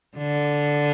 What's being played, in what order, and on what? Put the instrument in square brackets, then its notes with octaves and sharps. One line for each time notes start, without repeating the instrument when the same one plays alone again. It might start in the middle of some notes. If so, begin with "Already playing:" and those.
[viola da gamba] D3